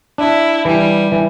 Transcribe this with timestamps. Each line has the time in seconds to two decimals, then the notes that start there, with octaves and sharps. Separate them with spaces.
0.18 D4 E4
0.65 E3 G3
1.12 E3